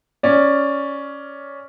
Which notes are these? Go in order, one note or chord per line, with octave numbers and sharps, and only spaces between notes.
C#4 D5